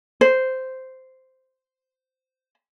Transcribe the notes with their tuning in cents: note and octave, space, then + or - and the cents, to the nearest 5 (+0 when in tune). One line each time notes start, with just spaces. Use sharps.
C5 -10